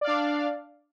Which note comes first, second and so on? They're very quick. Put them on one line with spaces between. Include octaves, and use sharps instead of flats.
D5 F5 D4